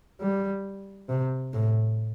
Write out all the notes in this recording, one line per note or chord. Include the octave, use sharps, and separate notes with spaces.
G3
C3
A2